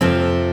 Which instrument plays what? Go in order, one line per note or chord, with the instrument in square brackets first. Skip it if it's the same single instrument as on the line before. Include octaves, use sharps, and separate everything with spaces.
[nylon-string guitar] F2 C3 F3 C4